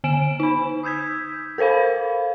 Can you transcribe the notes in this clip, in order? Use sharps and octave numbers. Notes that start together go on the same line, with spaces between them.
D3 G#5 D7 E7
D#4 B5
D#6 E6 G6 G#6 B6
A4 A#4 C5 F5 B5